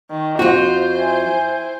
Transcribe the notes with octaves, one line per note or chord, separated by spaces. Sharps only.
D#3
F2 F4 F#4 C5
E4 G5 G#5